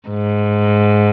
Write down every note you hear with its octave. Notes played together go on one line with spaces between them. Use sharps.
G#2